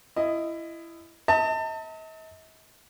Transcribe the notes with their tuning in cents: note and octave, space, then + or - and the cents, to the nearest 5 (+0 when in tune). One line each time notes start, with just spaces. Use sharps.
E4 +20 D#5 +0
D#5 +45 A5 +35